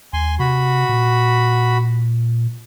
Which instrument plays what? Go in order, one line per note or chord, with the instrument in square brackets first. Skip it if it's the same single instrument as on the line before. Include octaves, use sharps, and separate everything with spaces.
[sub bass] D#2 [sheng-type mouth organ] G#5 C6
[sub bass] C3 [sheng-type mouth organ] F#4 B5
[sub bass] A#2